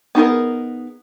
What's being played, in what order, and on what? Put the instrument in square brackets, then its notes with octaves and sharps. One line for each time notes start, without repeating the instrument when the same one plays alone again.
[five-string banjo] B3 D#4 G#4 A#4